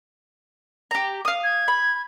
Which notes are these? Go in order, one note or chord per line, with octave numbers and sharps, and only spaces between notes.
G4 A#5
F5 D#6
G#6
B5